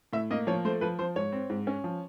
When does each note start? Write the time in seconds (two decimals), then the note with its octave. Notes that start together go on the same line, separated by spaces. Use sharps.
0.13 A2 E5
0.31 A#3 D#5
0.47 F3 C#5
0.65 A3 C5
0.81 F3 B4
0.99 F3 C5
1.16 G#2 C#5
1.32 C4
1.50 G#2
1.67 C#4
1.84 F3